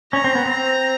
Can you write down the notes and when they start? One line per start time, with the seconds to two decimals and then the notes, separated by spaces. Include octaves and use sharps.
0.13 C#4 A#5
0.24 C4
0.35 B3
0.46 C4